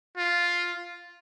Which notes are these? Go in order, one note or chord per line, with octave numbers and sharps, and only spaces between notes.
F4